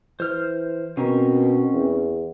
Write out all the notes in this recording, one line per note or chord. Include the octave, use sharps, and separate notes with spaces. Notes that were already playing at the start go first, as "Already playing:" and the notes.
E3 C5 F6
B2 C4 C#4 A#4
E2